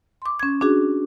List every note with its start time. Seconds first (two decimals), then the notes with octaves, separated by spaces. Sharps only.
0.22 C6 D6
0.40 C#4 G#6
0.61 D4 F#4 G#4